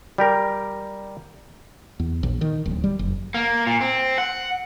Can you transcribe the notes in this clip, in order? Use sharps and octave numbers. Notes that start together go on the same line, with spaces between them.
G3 G4 A#4
E2
A#1
D#3
D1
G3
F#1
A#3
A#2
C4
F#5